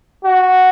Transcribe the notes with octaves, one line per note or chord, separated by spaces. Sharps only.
F#4